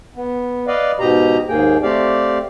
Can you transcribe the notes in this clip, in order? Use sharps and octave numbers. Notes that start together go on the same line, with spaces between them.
B3
B4 D5 D#5 F5
G#2 B2 G4 D#5 A#5
D#2 G#2 A#3 G#4 G5
A3 C4 G4 D5 F5